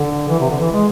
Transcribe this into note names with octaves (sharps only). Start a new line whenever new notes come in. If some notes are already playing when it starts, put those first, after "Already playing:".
Already playing: D3
E3
C3
D3
E3
G#3